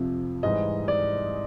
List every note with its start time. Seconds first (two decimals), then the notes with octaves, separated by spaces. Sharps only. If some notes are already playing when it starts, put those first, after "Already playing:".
Already playing: F2 C3 F3
0.43 G#2 E3 G3 D#5
0.88 D5